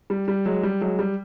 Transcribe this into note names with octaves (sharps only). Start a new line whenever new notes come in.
G3
G3
F#3 G#3
G3
F#3 G#3
G3